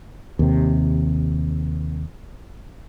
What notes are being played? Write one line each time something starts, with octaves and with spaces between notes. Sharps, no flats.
D#2 C3